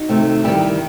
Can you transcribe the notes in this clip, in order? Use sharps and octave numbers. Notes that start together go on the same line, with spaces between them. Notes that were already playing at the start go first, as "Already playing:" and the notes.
Already playing: D#4 F#4
C3 D#3 A3
D#3 G3 E4 G4